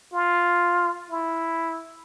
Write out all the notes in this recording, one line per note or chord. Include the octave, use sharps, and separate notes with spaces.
F4
E4